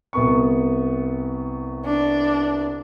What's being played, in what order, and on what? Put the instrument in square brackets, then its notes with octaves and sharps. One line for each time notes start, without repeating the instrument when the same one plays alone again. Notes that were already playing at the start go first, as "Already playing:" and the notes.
[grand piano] C2 B3 C#6
[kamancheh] D4